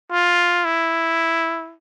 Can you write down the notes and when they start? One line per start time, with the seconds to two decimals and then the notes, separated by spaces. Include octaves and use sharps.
0.12 F4
0.65 E4